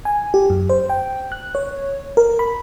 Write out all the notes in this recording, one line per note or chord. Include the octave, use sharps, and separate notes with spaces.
G#5
G4
F#2
C5
G5
F#6
C#5
A#4
B5